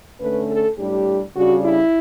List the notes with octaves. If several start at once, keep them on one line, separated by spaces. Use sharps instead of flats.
D3 A3 C#4 B4
A4
A2 G3 D4 G4
C#3 G3 D4 F#4
E4